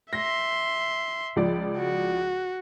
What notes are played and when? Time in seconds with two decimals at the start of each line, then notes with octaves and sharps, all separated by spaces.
0.13 E5 C6 A#6
1.36 C#2 F3 D5
1.77 F#4